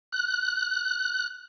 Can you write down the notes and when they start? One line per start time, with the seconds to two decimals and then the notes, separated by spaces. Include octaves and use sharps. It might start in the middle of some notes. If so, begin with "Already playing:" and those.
0.12 F#6